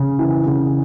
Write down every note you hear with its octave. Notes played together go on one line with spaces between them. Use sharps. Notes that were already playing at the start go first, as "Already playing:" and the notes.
Already playing: C#3
E3
C#3